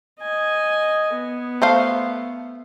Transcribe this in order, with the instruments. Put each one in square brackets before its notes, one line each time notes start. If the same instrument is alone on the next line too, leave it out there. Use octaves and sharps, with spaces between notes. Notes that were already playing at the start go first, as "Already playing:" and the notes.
[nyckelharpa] D#5 G#5
B3
[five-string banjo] A3 C5 F5